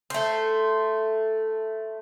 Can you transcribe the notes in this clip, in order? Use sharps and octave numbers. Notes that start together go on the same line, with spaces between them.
A3 C5